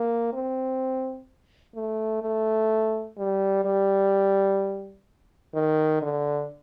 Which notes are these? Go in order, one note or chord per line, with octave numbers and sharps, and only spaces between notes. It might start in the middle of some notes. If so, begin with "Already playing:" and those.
Already playing: A#3
C4
A3
A3
G3
G3
D#3
D3